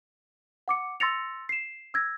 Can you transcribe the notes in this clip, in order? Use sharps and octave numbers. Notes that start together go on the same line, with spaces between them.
F#5 D6 C#7
C6 E6 A6 A#6 C#7 F7
C7 E7
E6 G#6 A#6